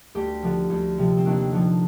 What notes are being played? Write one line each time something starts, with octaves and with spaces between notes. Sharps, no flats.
D2 G4
D3 F3
D2
C3 F3
C4
D#2 D4
D3 F3